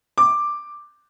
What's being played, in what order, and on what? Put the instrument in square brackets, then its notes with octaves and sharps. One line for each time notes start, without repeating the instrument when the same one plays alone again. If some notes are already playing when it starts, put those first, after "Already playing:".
[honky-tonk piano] D6